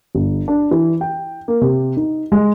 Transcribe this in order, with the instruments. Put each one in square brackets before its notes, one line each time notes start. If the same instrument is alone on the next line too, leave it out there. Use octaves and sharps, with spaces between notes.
[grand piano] G1
D4
E3
G5
A#3
C3
D#4
G#3